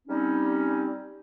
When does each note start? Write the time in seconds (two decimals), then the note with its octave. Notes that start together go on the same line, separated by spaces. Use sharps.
0.08 G3 C4 C#4 D#4